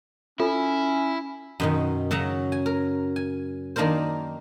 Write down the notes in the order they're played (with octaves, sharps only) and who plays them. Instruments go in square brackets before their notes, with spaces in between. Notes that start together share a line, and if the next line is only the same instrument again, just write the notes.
[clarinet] C#4 [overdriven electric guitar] E4 [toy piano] F4 A4
[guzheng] F#2 B2 D#3
C#3 F#3 E5 F#5 A#5
G#5
A#4
G#5
D#3 A#3 D4 A#4 C5